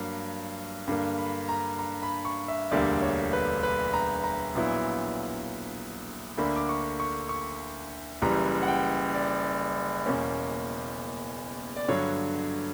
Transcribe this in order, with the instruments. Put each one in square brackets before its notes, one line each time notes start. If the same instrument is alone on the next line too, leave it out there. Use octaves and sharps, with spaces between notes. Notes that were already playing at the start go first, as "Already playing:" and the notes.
Already playing: [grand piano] G2 F#3 A#3
G2 D3 A#3
B5
A#5
A#5
B5
C#6
E5
E1 D2 D3 G3 A#3 D5
C#5
B4
B4
A#5
A#5
A#1 A#2 F#3 B3 E4
D2 D3 A#3 D4 B5
D6
C#6
C#6
C#6
F#1 F#2 E3 G3 A#5
F#5
G5
D5
E2 B2 A#3 C#4
D5
G2 D3 F#3 C#5